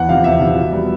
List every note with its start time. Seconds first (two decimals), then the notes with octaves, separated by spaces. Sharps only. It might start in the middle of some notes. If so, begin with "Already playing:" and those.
Already playing: E2 F#5
0.08 C3 F3 F5
0.24 E2 E5
0.40 C3 F3
0.57 B2
0.72 G3 B3